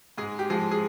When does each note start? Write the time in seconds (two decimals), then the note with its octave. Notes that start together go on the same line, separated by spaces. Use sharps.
0.18 G#2 G#3 G#4
0.39 G4
0.50 F3 G#3 G#4
0.71 G#4